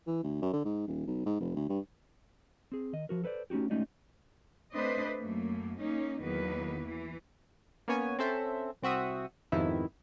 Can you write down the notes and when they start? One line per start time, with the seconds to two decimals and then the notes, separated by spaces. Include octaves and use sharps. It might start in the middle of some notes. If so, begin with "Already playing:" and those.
0.07 E3
0.23 D2
0.42 F#2
0.53 D3
0.65 G#2
0.87 D#1
1.07 B1
1.26 G#2
1.40 F1
1.56 D2
1.70 G2
2.72 C4 G#4
2.93 D#3 D#5
3.09 F3 F#4 A#4
3.24 A4 B4 C5 D5
3.50 A3 C#4 D#4 F#4 G4
3.70 G#3 A3 C#4 D#4 F#4 D5
4.73 A3 C4 D4 B4 C5 D#5
5.18 F#2 A3 A#3
5.78 A#3 C#4 D#4
6.20 E2 D#3 F#3 A#3 B4
6.85 E3
7.88 A#3 B3 C#4 C#5 G#5
8.19 C4 C#4 A4 C5 E5
8.82 C2 C4 F#4 E5 D#6
9.52 F2 G#2 C3 D#3 B3 E4